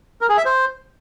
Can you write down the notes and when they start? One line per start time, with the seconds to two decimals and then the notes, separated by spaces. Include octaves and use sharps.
0.21 A#4
0.29 G#4
0.37 E5
0.46 C5